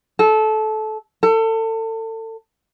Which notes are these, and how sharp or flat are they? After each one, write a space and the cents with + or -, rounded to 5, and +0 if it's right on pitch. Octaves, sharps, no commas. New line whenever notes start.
A4 -20
A4 +30